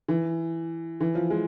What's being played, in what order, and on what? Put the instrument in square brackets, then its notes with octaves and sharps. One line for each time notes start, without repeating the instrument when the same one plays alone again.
[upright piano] E3
E3
F3
G#3